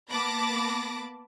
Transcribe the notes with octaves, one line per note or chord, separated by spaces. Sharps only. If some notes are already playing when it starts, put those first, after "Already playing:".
A#3 B3 A5 B5 D6 A#6